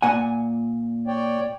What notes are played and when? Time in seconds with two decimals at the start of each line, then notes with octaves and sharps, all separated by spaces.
0.02 A#2 F#5 G#5
1.07 C#5 D5 G5